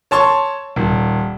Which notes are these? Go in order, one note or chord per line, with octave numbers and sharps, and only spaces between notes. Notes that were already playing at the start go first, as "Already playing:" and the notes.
C#5 A5 C6 C#6
D#1